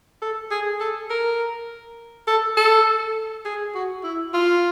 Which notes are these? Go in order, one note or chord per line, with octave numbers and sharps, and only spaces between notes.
A4
G#4
A4
A#4
A4
A4
G#4
F#4
E4
F4